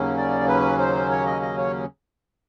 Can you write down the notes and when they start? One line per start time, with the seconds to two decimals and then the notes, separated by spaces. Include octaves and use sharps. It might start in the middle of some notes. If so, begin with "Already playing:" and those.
Already playing: D#2 C#3 F#3 A#3 C#4
0.18 D5
0.48 B4
0.79 C5
1.10 C#5
1.26 D#5
1.42 D#5
1.58 C#5